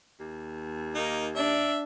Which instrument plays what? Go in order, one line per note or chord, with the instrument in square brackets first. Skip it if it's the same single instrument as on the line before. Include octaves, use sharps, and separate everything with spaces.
[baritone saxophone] D#2
[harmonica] A#3 D#4
[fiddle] D4 [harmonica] E5